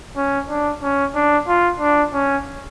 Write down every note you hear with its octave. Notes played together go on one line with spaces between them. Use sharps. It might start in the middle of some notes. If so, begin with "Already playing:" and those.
C#4
D4
C#4
D4
F4
D4
C#4